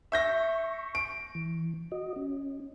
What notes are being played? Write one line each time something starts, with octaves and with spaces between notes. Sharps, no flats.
E5 C#6 G6 A#6
D7
E3
F#4 D#5
C#4